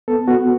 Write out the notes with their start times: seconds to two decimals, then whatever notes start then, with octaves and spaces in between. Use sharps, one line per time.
0.08 B3 A4
0.27 B3 F#4